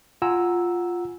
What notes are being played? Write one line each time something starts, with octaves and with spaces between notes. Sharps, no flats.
F4 F#5 G#5 A#5 E6